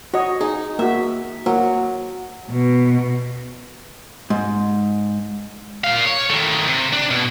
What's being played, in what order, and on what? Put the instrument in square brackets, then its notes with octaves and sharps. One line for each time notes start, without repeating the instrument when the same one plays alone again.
[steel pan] F#4 D#5 [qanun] C#5
[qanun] D#4 [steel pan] G#4
[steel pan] A#3 F#4 [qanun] E5
[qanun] F#3 [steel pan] A#3
[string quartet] B2
[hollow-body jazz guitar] G#2
[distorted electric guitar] A#2 F5
C#5
D#3 A3
C3
D4
B2